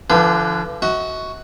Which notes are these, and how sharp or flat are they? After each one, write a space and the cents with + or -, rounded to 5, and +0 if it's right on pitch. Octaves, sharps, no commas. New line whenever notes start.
D3 +0 F3 -40 B4 +0
F#4 +0 D#5 +45